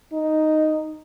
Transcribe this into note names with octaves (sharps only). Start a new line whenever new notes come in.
D#4